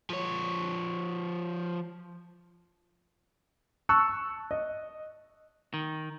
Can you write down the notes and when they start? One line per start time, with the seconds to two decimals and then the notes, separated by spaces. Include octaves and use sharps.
0.10 F3 C#5
3.89 A5 C#6 E6 F#6
4.51 D#5
5.74 D#3